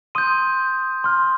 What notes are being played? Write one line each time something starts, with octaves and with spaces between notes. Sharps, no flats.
C6 D#6 G6 D#7
C6 F6